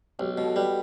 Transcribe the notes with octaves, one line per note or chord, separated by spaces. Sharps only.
B1 G4
G4
B2
F#4 A4
G3 G4 B4